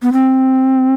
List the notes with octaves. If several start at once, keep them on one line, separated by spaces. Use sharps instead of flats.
B3
C4